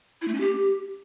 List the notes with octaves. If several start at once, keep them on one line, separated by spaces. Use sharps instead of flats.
E4
A3
C#4
G4